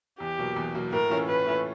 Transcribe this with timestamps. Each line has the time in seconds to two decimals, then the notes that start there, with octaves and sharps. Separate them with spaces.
0.19 E2 G4
0.38 B2 F#3 A#3
0.56 E2
0.74 B2 F#3 A#3
0.92 A2 A#4
1.10 E3 A3 C#4 F4
1.28 A2 B4
1.46 E3 A3 C#4 F4